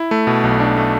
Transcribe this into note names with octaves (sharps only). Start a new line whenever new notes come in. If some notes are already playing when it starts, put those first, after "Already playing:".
Already playing: E4
A3
B2
B1
D4
A3